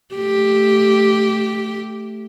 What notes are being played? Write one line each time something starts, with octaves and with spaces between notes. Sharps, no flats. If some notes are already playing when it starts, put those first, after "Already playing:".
A3 G4